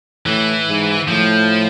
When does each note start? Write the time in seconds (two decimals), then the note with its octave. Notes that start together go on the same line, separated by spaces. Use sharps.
0.25 A2 E3
0.67 G#2
1.08 A2 F3